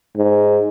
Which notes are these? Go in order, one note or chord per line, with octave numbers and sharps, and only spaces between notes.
G#2